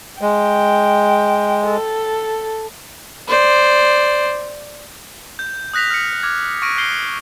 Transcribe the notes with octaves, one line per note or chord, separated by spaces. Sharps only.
G#3 G5
A4
C5 D5
G6
D#6 F#6 A#6 B6 F7
F6 C#7
D6 F6 G#6
C#6 F6 A#6 D7 D#7
D#6 F6 G6 C7 D7 G7